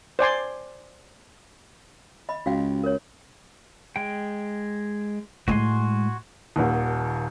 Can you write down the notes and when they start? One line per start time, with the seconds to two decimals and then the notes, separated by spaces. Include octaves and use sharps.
0.19 C5 D5 G#5 C6
2.29 D#5 B5
2.46 C#2 F#4 F5 G5
2.83 A#4 C#5
3.96 G#3 G5
5.48 A2 G#3 F#4 G#5 C6
6.56 D#1 D#2